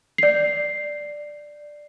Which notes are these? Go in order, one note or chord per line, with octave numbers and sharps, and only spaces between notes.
D5 C7